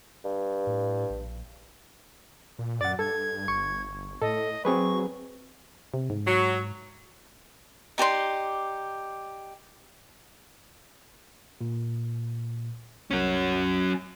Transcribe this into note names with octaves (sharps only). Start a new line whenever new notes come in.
G2
A2
A#1
A#2
F#2 D5 F#5 A6
G2 A4 G#6
G1 C#6
A2 A4 D#5
F#3 C4 G#4 B4 C#6
C3
G#2
F#3
D#4 G4 D5 C6
A#2
C2 F#3 C#4